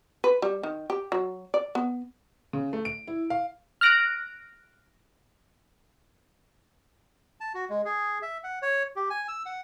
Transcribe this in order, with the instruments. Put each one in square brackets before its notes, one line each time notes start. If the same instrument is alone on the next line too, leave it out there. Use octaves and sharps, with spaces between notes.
[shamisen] B4
G3
D#3
G4
F#3
D5
B3
[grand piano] C#3
A3
D7
E4
F5
[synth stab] F6 F#6 A#6 D7
[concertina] A5
F#4
G#3
G#4
E5
F#5
C#5
G4
G#5
E6
F#5